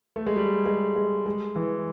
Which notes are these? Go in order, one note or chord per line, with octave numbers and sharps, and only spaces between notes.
A3
G#3
G3
G#3
G#3
G#3
E3